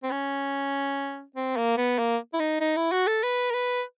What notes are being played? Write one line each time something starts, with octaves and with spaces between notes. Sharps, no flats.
C4
C#4
C4
A#3
B3
A#3
E4
D#4
D#4
E4
F#4
A4
B4
A#4
B4